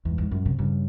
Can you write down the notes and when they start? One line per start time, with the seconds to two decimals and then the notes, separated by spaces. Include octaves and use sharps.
0.05 E2 G#2
0.18 G#2
0.31 F#2 A2
0.45 C3
0.58 G2 C#3